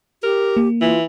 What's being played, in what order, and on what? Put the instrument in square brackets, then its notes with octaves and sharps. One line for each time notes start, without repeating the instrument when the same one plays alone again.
[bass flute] G4 [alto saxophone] A#4
[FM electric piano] A#3
[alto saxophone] E3 [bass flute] F4